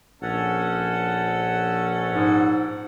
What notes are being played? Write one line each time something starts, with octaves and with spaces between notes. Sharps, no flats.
A#1 C#4 A4 F#5
G#2